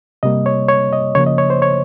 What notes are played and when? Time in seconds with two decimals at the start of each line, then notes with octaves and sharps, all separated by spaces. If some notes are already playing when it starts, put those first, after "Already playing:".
0.23 C3 G3 A#3 D#5
0.46 C#5
0.68 C#5
0.93 D#5
1.15 C#3 F3 A#3 C#5
1.26 D#5
1.38 C#5
1.50 C5
1.62 C#5